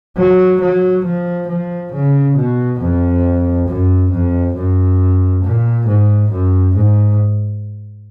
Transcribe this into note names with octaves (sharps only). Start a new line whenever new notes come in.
F#3
F#3
F3
F3
C#3
B2
F2
F#2
F2
F#2
A#2
G#2
F#2
G#2